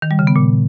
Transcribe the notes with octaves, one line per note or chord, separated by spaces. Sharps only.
D#3
G3
C#3
B3
A#2